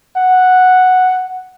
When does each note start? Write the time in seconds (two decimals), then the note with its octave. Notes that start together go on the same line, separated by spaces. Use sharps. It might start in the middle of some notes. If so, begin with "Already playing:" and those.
0.17 F#5